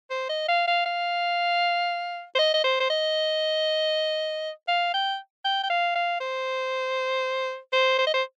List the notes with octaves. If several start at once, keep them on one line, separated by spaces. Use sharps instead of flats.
C5
D#5
F5
F5
F5
C5
D#5
D#5
C5
C5
D#5
F5
G5
G5
G5
F5
F5
C5
C5
C5
D#5
C5